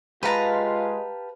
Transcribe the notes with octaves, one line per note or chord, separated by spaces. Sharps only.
G#3 F4 G4 B4 F5 A5 A#5